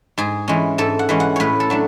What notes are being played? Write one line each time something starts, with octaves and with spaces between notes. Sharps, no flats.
G#2 G#4
E3 G#3 C#4
G#2 A4
F#5
E3 G#3 C#4
F#5
A2 B4 C#5
A4
F#3 A3 D4